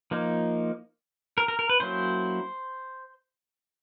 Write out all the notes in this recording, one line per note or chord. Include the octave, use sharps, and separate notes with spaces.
F3 A#3 D#4
A#4
A#4
A#4
B4
F#3 A#3 C#4 E4 C5